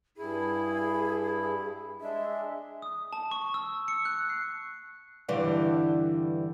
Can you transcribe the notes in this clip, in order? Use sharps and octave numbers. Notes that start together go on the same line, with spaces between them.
G2 E4 G#4
G#3 D4 E5
D#6
A5
C#6
E6
C#7
F#6
C7
G2 D3 E3 G3